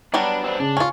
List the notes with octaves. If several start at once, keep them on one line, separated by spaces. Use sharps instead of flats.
F#3 G3 B3 D4
C4 D4
C#3 D4
C#4 F4 G#5 C#6